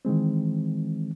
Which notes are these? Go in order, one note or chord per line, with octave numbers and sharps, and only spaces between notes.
D#3 E3 G#3 C4